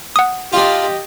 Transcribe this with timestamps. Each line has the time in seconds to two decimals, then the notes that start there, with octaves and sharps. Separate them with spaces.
0.16 F#5 D#6
0.53 D4 F4 G4 D#5